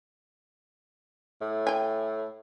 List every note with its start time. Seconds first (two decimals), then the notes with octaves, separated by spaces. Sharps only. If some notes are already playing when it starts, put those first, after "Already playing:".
1.41 A2
1.67 G5 G#5